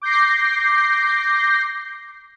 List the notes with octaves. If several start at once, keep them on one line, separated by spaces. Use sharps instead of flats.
D6 G6 A#6 C7